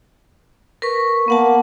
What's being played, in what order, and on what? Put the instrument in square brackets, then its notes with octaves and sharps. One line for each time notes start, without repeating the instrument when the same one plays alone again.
[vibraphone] A#4 B4 C#6
[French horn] A#3 [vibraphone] B3 F#5 A5